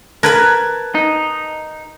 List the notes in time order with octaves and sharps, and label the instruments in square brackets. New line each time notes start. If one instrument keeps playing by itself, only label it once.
[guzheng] A#4 B4 B5 [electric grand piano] A5 F#6 G#6
[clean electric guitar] D#4